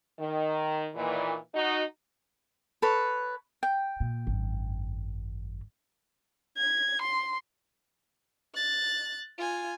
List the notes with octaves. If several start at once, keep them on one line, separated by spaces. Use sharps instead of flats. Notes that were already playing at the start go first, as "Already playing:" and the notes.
D#3
A#2 D#3 E3
D#4 F#4
A4 B4 C#5
G5
A#2
G#1 F#2
G#6
C6
F#6 A6
F4 G#5